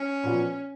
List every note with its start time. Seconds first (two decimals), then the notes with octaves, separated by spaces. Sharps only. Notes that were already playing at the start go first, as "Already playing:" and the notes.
Already playing: C#4
0.23 A#2 F3 B3 F#4